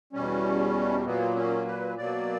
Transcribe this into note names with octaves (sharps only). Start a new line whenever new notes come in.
E2 B2 G3 C#4
A#2 F#3 A#3 B3
C#4
B4
B2 F#3 A#3 D5